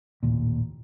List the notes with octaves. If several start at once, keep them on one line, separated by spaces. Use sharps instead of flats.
A1 D#2 A#2